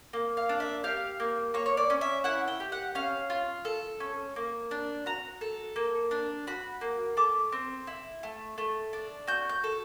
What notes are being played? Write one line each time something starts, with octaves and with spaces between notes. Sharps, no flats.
A#3
F5
D4
E5
G4 F5
A#3
A#3 C#5
C#5
D5
C#4
E5
E4 F#5
G5
G4
F#5
C#4 F5
F4
A4
C#4
A#3
D4
F#4 A#5
A4
A#3
D4
F#4 B5
A#3
A3 D6
C4
E4
A3
A3
D4
F#4 G6
G6
A4